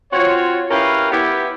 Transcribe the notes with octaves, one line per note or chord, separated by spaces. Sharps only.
C4 F4 F#4 C#5
C#4 E4 G4 A#4 B4 F5
B3 E4 G4